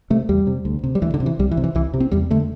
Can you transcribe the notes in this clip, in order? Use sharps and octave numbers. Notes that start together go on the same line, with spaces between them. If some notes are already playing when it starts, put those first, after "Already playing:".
C3 A3
E2 G3
C3
D2
C3
G3
D2 E3
D3
C3
E3
C2 G3
E3
C3
E3
C2 E3
C3
C4
E2 G3
D3 A3